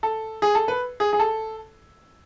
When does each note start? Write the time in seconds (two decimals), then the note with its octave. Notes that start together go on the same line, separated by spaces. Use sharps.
0.03 A4
0.42 G#4
0.55 A4
0.68 B4
1.00 G#4
1.13 G#4
1.20 A4